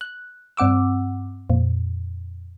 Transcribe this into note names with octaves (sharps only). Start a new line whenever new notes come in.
F#6
G2 C4 F#5 D6 E6
F2 A#2